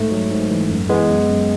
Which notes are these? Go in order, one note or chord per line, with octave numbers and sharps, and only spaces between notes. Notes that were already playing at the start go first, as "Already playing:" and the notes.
Already playing: G#2 A3
F#3
G#2
E3
F#2
E3 G#3 B3
F#2
F#2